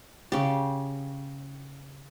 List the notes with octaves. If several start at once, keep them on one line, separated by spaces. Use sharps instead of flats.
C#3 G4